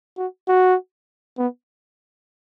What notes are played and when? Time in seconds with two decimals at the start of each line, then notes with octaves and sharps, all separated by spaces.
0.18 F#4
0.48 F#4
1.38 B3